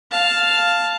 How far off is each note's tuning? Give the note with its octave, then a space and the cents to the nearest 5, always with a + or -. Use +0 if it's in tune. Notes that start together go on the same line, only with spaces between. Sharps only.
F5 +0 A5 +0